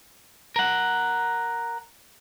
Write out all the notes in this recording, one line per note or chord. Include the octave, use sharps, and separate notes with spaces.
A#4 F#5